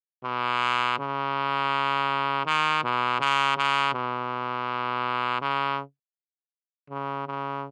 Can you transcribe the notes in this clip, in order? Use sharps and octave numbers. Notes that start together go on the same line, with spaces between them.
B2
C#3
D#3
B2
C#3
C#3
B2
C#3
C#3
C#3